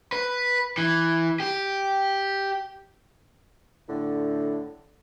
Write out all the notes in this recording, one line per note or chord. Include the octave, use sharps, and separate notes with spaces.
B4
E3
G4
A2 D3